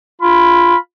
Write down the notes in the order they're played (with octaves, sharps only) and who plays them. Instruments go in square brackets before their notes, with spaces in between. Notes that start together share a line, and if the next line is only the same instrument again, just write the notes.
[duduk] F4 [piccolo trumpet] B5